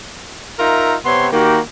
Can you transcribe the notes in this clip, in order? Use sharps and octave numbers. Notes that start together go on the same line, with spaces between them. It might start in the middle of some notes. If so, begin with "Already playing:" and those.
D#4 F4 A#4 E5
C3 B3 C4 C#5 C6
D#3 A#3 F#4 G4